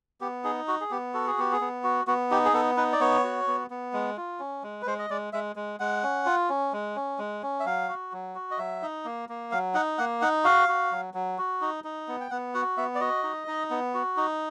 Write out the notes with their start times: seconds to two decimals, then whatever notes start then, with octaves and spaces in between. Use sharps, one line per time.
0.21 B3 G4
0.44 D#4 G#4
0.68 F#4
0.81 G#4
0.91 B3 G4
1.14 F#4 A4
1.27 G#4
1.38 B3 G4
1.52 G#4
1.61 B3
1.84 F#4
2.07 B3 F#4
2.31 D#4 G4
2.45 G#4
2.53 B3 A4
2.77 D#4 B4
2.93 D5
3.00 B3 C#5
3.24 F#4
3.48 B3
3.70 B3
3.93 G#3
4.17 F4
4.40 C#4
4.63 G#3
4.82 B4
4.86 G#3 C5
4.99 D#5
5.10 G#3 D5
5.33 G#3 E5
5.56 G#3
5.80 G#3 F#5
6.03 C#4
6.26 F4
6.49 C#4
6.73 G#3
6.96 C#4
7.19 G#3
7.43 C#4
7.60 E5
7.65 F#3 F5
7.89 F#4
8.12 F#3
8.35 F#4
8.51 D#5
8.58 F#3 E5
8.82 D#4
9.05 A#3
9.29 A#3
9.52 F#3 F5
9.74 D#4 F#5
9.98 A#3 F#5
10.22 D#4 F#5
10.44 F#4 F5
10.68 F#4
10.91 F#3
11.14 F#3
11.38 F#4
11.61 D#4
11.84 D#4
12.08 B3
12.21 G5
12.30 B3 F#5
12.54 F#4 F#5
12.77 B3 E5
12.95 D5
13.01 F#4 D#5
13.23 D#4
13.48 D#4
13.70 B3
13.94 F#4
14.17 D#4